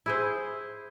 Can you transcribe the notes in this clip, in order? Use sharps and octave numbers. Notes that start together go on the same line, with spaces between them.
E4 G#4 C5